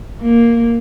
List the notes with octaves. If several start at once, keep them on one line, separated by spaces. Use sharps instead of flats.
A#3